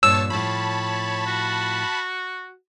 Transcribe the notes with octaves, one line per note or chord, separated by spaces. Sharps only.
G2 A#2 C#5 A5 E6
A2 F3 C#5 A5 B5
F#4